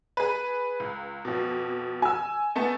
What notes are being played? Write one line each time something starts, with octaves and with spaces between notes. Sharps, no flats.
G#4 B4
C#2
F2 B2
G#5 E6
A3 B3 A5